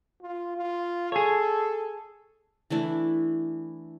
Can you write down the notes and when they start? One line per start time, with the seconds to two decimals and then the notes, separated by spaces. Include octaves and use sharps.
0.21 F4
0.57 F4
1.12 G#4 A4 C#5
2.70 E3 A3 D4 E4